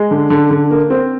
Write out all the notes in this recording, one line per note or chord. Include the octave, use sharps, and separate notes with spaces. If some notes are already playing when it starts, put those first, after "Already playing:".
Already playing: G#3
D3
D3
D3
A#3
C4